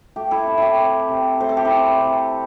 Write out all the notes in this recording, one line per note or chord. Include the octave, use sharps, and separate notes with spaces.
A3 G4
E4 A4
C4 E4
E4 G4
C3
C3
A3 C5
A4
G4
E4 A4
C4
C3